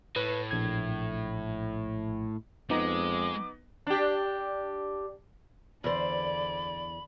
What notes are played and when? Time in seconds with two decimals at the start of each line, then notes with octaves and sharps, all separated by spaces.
0.16 A2 B4
0.51 A#1 G#6
2.70 F2 G#3 B3 D#4 D6
3.87 D4 G4
5.84 E2 D3 C5 D5 B5